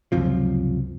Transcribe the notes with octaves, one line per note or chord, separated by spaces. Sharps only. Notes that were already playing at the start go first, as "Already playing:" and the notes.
C#2 F#2 C3 F3